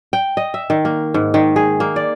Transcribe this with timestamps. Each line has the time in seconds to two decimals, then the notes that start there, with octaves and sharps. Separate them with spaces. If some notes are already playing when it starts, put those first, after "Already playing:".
0.13 G5
0.37 D#5
0.54 E5
0.70 D#3
0.85 A#3
1.14 G#2
1.34 D#3
1.56 G#4
1.80 A#3
1.96 D5